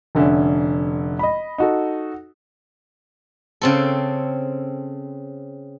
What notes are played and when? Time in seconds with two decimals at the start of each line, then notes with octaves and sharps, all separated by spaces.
0.15 F1 D3 C#4 E5
1.19 D#5 B5
1.58 D#4 F#4 A4
3.61 C#3 C4 A4